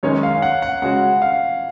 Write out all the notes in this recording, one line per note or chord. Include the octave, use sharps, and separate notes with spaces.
F#2 D#3 G#3 C#4 C#5
F5
F#5
F#5
C#3 G#3 C#4 F#4 F#5
F5